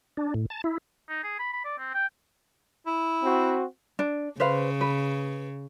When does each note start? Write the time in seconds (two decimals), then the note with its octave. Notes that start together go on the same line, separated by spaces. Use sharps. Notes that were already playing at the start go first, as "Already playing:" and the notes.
0.17 D4
0.34 A2
0.50 A5
0.64 E4
1.09 D#4
1.23 G#4
1.39 B5
1.53 B5
1.65 D5
1.78 C4
1.94 G5
2.86 E4
3.23 C4 F#4
3.99 D4
4.40 C#3 B4 C5 F5
4.81 B4